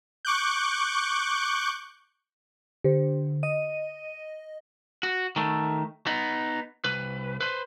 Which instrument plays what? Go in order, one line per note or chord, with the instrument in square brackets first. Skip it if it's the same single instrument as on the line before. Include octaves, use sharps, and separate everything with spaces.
[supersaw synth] C#6 D6 F#6 G6
[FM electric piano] D3 [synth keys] G4 C5
[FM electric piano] D#5 [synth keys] D#7
[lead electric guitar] F#4
D#3 A3
B3 D#4
C2 B4
B4 C5